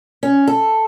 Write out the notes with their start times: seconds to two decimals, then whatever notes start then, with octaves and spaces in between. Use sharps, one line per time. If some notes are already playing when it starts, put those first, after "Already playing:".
0.23 C#4
0.47 A4